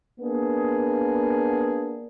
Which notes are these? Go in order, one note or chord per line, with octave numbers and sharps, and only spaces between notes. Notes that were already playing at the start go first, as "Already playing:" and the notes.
A#3 B3 D4 G#4